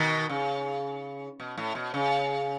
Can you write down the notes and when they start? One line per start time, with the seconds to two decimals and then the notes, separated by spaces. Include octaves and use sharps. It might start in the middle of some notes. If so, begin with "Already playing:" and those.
Already playing: B2 D#3
0.29 C#3
1.40 B2
1.58 A2
1.75 B2
1.94 C#3